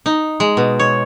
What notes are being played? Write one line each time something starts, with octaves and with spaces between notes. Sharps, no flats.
D#4
G#3
B2
C#5